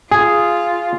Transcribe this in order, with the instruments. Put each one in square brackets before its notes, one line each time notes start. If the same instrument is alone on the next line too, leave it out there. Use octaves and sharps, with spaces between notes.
[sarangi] F4 [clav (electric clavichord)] G#4